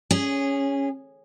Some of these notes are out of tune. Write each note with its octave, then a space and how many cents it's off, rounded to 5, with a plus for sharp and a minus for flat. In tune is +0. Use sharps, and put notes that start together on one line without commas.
C#4 +0 G#4 -15